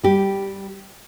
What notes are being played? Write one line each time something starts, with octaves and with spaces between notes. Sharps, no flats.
G3 G4